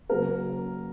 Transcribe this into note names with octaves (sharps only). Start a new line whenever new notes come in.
C#3 F#3 A#3 A#4